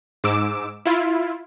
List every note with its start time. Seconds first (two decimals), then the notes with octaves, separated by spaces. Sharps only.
0.24 G#2 D6 E6
0.86 E4 F4